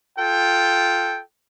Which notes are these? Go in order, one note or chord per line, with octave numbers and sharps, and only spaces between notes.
F4 A4 G5